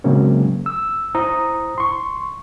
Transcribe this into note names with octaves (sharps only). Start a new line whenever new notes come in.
C#3 F#3 G#3 A#3 C4 C#4
E6
E4 C5 A#5 D#6
C6 C#6